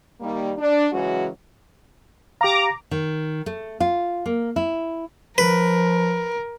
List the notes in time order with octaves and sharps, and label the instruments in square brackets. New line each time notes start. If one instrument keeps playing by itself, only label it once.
[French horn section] D#3 G3 A#3
D4
C#3 E3 F#3 G#3 C#4 F#4
[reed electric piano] G4 F5 [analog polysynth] A#5 D6
[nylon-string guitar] D#3
A3
F4
A#3
E4
[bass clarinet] F3 [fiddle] A#4 [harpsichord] B4